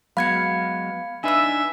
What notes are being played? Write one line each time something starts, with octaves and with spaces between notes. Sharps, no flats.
F#3 G#3 B3 F5 B5 G#6 C#7
D4 D#4 B4 E5 G#5 E6